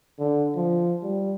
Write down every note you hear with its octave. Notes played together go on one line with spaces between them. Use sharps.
D3
F3
G3